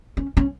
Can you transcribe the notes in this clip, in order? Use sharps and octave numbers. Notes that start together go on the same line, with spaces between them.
C#4
C#4